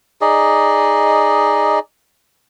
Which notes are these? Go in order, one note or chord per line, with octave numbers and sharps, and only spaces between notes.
D#4 G#4 D5 D#5